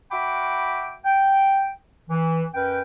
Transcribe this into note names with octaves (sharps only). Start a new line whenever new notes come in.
F#4 E5 F#5 G5 B5 D6
G5
E3
F#2 C#4 B4 G5